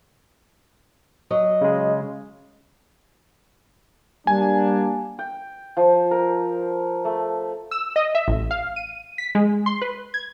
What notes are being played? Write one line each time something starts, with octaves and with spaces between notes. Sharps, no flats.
F#3 D#5
C#3 G#3
G3 A#3 D4 G#5
G5
F3
A#4
A3
E6
D#5
E5
A1
F5
D#7
B6
G#3
C6
B4
G#6